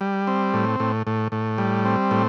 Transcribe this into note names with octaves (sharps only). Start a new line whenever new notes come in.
G3
C4
A2
A2
A2
A2
G3
C4
A2